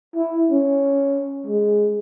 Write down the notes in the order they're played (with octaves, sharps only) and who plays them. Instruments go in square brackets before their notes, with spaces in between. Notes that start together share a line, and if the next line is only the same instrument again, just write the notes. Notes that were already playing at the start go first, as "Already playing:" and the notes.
[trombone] E4
C#4
G#3